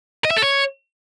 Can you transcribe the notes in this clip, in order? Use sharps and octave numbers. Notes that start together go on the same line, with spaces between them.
D#5
E5
A4
C#5